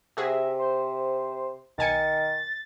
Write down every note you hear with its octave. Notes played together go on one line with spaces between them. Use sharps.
C3 F#4 G#4 E5 A#6
C5
B1 D#3 G#5 A6 C#7